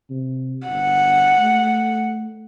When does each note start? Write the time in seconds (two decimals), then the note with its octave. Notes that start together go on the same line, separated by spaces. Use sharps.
0.10 C3
0.67 G1 F#5
1.39 A3